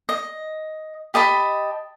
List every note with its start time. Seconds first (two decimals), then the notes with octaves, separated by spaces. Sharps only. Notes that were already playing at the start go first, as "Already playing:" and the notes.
0.09 D#5
1.14 G4 D#5 A5 B5